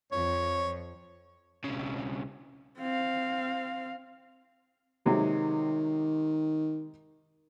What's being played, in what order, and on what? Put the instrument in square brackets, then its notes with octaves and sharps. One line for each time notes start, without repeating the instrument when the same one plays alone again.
[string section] F2 [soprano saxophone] C#5
[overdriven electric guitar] B1 C#3
[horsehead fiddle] C4 F5
[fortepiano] C3 F#3 G#3 [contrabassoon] D#3